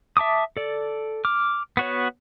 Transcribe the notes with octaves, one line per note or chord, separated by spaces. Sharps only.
E5 A5 D6 D#6
A4 D5
D6 F6
B3 F#4 C#5